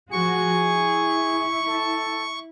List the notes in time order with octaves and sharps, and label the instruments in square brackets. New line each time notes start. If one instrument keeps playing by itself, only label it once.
[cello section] F3 F#4 [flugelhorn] G#4 [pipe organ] C#6
[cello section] E4
[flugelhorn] A4